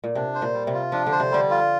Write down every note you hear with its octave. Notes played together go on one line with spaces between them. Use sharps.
A#2
C3 D4
C5
A#2
G3
C3
F4
F3 D4
D3
C5
C3
D3 G3
F4